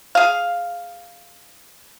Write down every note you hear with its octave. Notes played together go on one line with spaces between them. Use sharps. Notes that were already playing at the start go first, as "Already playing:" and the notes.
G#4 F5